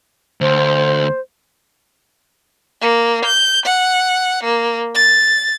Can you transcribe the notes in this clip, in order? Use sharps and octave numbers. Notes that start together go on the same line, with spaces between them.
D2 C5
A#3
G6
F#5
A#3
A6